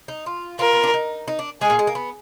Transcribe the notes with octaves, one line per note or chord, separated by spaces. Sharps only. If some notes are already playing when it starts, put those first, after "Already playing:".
D#4
F4
F4 A#4
B3
D4
D#4
D#4
D4
G#3 G#4
A#2
G#3
A#3
B3